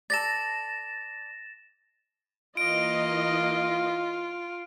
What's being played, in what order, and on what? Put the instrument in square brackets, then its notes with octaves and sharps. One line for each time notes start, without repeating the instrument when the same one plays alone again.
[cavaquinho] A4 D5 [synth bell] A6 A#6 E7
[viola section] E3 A#3 D#5 [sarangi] F4 [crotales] D7